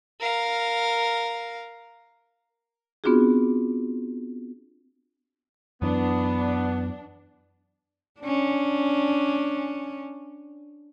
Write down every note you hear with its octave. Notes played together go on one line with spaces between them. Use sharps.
A#4 F5
B3 C4 D4 F4 F#4 G#4
F#2 E3 B3 D4
C#4 D4